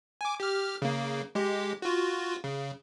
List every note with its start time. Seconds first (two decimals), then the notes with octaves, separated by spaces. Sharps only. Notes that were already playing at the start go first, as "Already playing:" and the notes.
0.21 G#5 D6
0.40 G4 F6
0.82 C#3 A#3
1.35 G#3 G4
1.82 F4 F#4
2.44 C#3